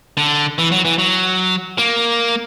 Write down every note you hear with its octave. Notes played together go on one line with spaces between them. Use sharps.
D3
E3
F#3
E3
F#3
A#3